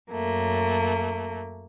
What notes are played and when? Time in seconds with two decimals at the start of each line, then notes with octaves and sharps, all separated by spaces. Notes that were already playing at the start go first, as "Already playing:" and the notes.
0.12 F#2 A3 A#3